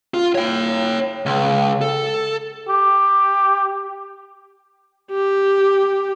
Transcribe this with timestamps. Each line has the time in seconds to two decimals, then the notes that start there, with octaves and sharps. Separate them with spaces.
0.14 F4
0.35 C#5 G5
1.26 C#2
1.81 A4
2.69 G4
5.12 G4